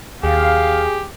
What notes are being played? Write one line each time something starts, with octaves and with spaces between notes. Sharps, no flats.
D#2 G4 G#4 F5